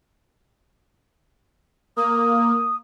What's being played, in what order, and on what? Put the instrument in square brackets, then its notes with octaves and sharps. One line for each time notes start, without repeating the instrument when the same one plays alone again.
[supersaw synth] A#3 [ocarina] D#6